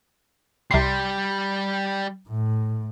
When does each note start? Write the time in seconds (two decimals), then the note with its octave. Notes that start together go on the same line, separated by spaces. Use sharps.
0.71 C2 G3 C6
2.29 A2